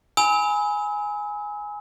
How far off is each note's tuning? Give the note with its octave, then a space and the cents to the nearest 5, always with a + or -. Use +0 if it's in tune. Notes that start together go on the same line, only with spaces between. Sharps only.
G#5 +0 B5 +0 E6 -45